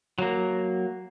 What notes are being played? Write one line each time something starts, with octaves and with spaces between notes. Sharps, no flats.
F#3 A#3